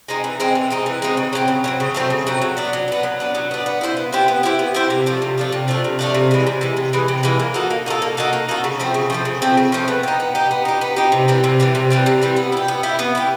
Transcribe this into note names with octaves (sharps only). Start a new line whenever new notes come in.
G#3 C4 D#4
E3
G#3 C4 D#4
E3
G#3 C4 D#4
E3
G#3 C4 D#4
C#3
F#3 A3 C4
C#3
F#3 A3 C4
C#3
F#3 A3 C4
C#3
F#3 A3 C4
F#3
B3 D4
F#3
B3 D4
F#3
B3 D4
F#3
B3 D4
B3
E4 G4 C5
B3
E4 G4 C5
B3
E4 G4 C5
B3
E4 G4 C5
C3
F3 A3 D4
C3
F3 A3 D4
C3
F3 A3 D4
C3
F3 A3 D4
C3
E3 G#3
C3
E3 G#3
C3
E3 G#3
C3
E3 G#3
A#3
D#4 F#4 A4
A#3
D#4 F#4 A4
A#3
D#4 F#4 A4
A#3
D#4 F#4 A4
C#3
F3 A3 C4
C#3
F3 A3 C4
C#3
F3 A3 C4
C#3
F3 A3 C4
B3
D#4 G4
B3
D#4 G4
B3
D#4 G4
B3
D#4 G4
C3
E3 G3 C4
C3
E3 G3 C4
C3
E3 G3 C4
C3
E3 G3 C4
B3
E4
G4
B3
E4 G4
B3
E4 G4